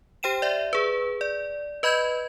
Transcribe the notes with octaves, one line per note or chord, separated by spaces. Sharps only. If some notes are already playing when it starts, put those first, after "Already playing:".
G4 C5 G5 D#7 E7
D5 E5
G#4 B4
D5
B4 D#5 B5 G6 G#6